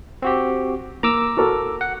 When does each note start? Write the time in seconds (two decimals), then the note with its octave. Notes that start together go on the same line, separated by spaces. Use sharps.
0.22 C4 F#4 G4
1.03 A#3 A#5 D6 E6
1.37 F#4 A4 A#4
1.81 F#5